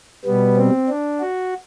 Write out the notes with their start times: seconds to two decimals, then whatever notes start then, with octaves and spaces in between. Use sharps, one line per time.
0.25 B2 G3 B3
0.57 C4
0.89 D4
1.21 F#4